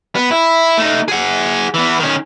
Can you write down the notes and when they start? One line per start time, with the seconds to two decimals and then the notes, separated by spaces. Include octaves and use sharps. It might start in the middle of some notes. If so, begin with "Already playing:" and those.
0.15 B3
0.31 E4
0.78 A3 D#4
1.08 G#4 F#5
1.74 E3 B3
1.99 D#3 C#4